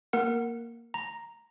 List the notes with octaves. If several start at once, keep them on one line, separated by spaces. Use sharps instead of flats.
A#3 A#4 F#5
A#5